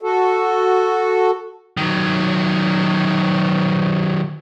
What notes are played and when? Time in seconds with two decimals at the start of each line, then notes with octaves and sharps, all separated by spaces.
0.02 F#4 A4
1.77 D#3 F#3